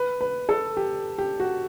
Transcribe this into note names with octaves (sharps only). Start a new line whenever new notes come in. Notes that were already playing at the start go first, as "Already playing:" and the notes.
Already playing: B4
B4
A4
G4
G4
F#4